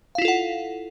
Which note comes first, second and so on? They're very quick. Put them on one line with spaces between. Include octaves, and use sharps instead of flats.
F5 E4 F4 A4 F#5